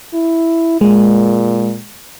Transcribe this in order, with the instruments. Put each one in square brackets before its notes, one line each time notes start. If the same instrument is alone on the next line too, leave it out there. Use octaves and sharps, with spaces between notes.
[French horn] E4
[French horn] A#2 [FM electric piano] G#3